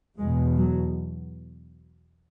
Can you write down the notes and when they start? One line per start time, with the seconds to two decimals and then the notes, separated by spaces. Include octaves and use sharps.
0.18 E2 B2 G#3
0.57 F#3